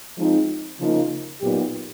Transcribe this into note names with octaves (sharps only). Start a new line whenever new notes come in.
F3 G#3 C4 D#4
C#3 F3 A#3 D#4
A#2 F#3 B3 D#4 G4